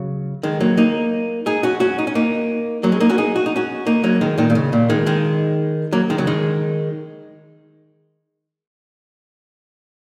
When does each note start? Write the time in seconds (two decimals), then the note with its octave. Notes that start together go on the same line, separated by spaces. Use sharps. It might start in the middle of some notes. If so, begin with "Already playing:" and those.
Already playing: C#3 F#3
0.43 D#3 G#3
0.60 F#3 A#3
0.77 A#3 D#4
1.46 D#4 G#4
1.63 C#4 F#4
1.80 C#4 F#4
1.98 D#4
2.07 C#4
2.15 A#3 D#4
2.83 F#3 A#3
2.92 G#3 C#4
3.00 A#3 D#4
3.10 C#4 F#4
3.18 D#4 G#4
3.36 F#4
3.46 D#4
3.56 C#4 F#4
3.87 A#3 D#4
4.04 F#3 A#3
4.21 D#3 G#3
4.38 A#2 D#3
4.50 A#2
4.55 C#3
4.73 A#2
4.90 D#3 G#3
5.06 D#3 G#3
5.92 F#3 A#3
6.10 D#3 G#3
6.18 C#3 F#3
6.27 D#3 G#3